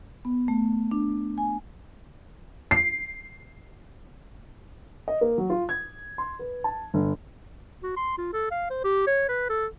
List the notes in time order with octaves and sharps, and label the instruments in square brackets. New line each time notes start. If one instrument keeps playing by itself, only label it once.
[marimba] B3
A3
D4
G#5
[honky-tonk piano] C7
[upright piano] D#5
A#3
F#3
F4
G#6
C6
B4
A5
G1
[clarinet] F#4
C6
F4
A4
F5
C5
G4
C#5
B4
A4